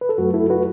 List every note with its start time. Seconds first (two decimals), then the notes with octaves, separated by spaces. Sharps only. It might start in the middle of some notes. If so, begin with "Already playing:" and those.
0.01 B4
0.09 A4
0.18 F#2 F#3 A3 F#4
0.34 E4 A4
0.50 F#4 B4